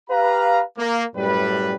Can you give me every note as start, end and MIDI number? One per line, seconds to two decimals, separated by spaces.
0.10 0.61 67
0.10 0.61 71
0.10 0.61 77
0.10 0.61 82
0.78 1.03 58
1.15 1.74 42
1.15 1.74 45
1.15 1.74 55
1.15 1.74 71